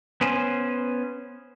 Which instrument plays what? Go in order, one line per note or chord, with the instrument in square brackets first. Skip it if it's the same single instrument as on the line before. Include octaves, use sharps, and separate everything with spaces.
[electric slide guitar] B3 C#4 C5 G#5